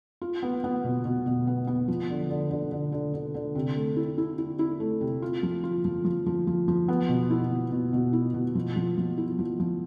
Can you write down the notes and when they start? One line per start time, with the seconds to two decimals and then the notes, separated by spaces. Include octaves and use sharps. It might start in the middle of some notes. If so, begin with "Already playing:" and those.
0.22 F4
0.43 B3
0.64 B3
0.84 B2
1.05 B2
1.26 B2
1.47 B3
1.67 B3
1.88 F3
2.10 D3
2.30 D3
2.51 D3
2.72 D3
2.92 D3
3.14 D3
3.34 D3
3.55 C3
3.76 A3
3.96 E4
4.18 E4
4.38 E4
4.59 E4
4.80 A3
5.01 C3
5.22 F4
5.43 F3
5.64 F4
5.85 F3
6.05 F3
6.26 F3
6.47 F3
6.68 F3
6.88 B3
7.09 B2
7.30 E4
7.51 B2
7.72 B2
7.93 B2
8.13 E4
8.34 B2
8.55 F3
8.76 F3
8.98 F3
9.18 E4
9.39 F3
9.60 F3